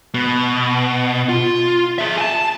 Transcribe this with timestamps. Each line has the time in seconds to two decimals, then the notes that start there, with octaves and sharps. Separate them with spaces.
0.14 B2
1.29 F4
1.98 G#4 E5
2.18 G#5 A5